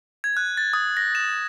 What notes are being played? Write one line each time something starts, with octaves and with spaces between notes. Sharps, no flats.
G#6
F#6
A6
D#6
A#6
E7